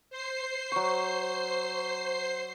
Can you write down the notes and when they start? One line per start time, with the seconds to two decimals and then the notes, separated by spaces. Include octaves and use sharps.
0.10 C5 C7
0.72 F#3 C#6